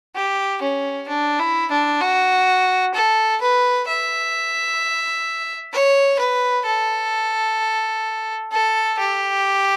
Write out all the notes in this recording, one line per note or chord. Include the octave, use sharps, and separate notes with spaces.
G4
C#4
D4
E4
D4
F#4
A4
B4
E5
C#5
B4
A4
A4
G4